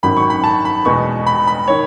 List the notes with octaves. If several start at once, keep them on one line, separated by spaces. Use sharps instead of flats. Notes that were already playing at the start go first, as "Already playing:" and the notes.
G#1 F#2 D#3 F#3 B5
C#6
B5
A5
B5
E2 B2 G#3 B3 C#6
B5
B5
D#3 C#5